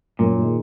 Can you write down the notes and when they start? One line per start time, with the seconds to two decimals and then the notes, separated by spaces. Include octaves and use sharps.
0.19 F#2 A#2
0.38 D#3 G#3